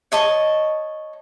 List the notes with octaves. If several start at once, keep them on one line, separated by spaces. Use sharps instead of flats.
C#5 D#5 A5 C#6